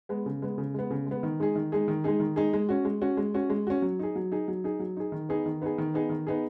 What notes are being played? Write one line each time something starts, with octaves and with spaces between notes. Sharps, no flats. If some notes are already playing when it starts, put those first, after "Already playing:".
G#3 B3
C#3
G#3 B3
C#3
G#3 B3
C#3
G#3
B3
D#3
G#3 D#4 G#4
D#3
G#3 D#4 G#4
D#3
G#3 D#4 G#4
D#3
G#3 D#4 G#4
G#3
C#4 F#4
G#3
C#4 F#4
G#3
C#4 F#4
G#3
C#4 F#4
F#3
D#4 G#4
F#3
D#4 G#4
F#3
D#4 G#4
F#3
D#4 G#4
D#3
B3 D#4 G#4
D#3
B3 D#4 G#4
D#3
B3 D#4 G#4
D#3
B3 D#4 G#4